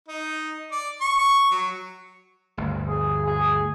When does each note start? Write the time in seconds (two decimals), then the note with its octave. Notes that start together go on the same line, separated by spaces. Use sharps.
0.08 D#4
0.72 D5
1.02 C#6
1.51 F#3
2.57 G1 D2
2.88 G#4
3.26 G#4